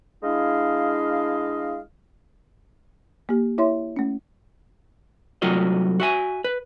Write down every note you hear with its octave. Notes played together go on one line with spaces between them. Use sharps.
G#3 D4 E4 D#5 F5
A#3 G4
E4 C#5 E5 C6
A3 C#4
C2 F#3 A3 F4 F#4 D#5
F#4 E5 G#5
B4